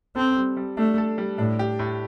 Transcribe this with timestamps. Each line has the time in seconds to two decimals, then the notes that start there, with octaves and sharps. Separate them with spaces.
0.16 C4 A4
0.37 G3
0.57 G3
0.77 A3 D4
0.98 A4
1.18 G3
1.38 A2 D4
1.59 G4
1.79 A2